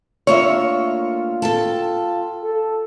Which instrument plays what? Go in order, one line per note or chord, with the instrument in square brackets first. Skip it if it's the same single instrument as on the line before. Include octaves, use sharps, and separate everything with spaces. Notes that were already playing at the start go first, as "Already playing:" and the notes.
[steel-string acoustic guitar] D2 A#3 E5 [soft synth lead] F4 [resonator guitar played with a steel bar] C#5
[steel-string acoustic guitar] A4 G5 A5
[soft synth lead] A4